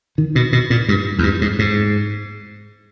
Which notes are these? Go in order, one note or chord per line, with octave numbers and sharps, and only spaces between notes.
D#3
B2
B2
A#2
G2
E2
G2
G#2
G#2